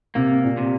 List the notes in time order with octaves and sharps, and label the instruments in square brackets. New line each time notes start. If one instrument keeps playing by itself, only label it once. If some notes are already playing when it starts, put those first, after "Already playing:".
[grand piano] C3 [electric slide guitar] A#3
[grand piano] A#2
[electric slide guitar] C3